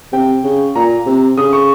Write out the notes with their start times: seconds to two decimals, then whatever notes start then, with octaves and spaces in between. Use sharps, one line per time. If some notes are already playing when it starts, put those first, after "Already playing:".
0.13 C3 G5
0.44 C#3
0.75 A#2 A#5
1.06 C3
1.37 C#3 D#6
1.53 C#6